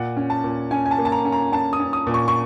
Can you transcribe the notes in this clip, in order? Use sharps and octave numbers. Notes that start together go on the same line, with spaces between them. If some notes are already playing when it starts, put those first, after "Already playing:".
Already playing: A#2 F#5
C#4
A5
A#2
C#4 G#5
G#5
A5
A#3
A5
A#5
C#4
A#5
C#4 A5
D#6
C#4
D#6
A#2
C#6
C#6